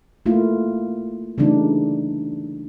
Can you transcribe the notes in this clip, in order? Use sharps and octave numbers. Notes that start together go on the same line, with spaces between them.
A3 A#3 E4 F4
C#3 E3 G3 A3 D4 D#4